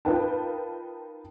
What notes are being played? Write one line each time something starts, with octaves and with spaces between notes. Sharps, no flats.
D#4 F4 A#4 B4 G5 A5